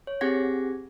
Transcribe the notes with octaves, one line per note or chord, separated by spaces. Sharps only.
C#5
C4 G4 G#4 F#5 G#6 A#6